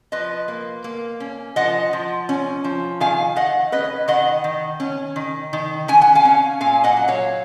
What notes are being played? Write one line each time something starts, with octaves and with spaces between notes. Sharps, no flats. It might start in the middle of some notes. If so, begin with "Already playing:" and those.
F3 B4 D#5
A#3
A#3
C#4
F3 D#5 F#5
F3
C#4
F3
D#3 F5 G#5
D#3 D#5 F#5
C#4 B4 D#5
D#3 D#5 F#5
D#3
C#4
D#3
D#3
C#4 G#5
F#5
F5 G#5
C#4
A#2 F5 G#5
D#5 F#5
F#3
C#5 F5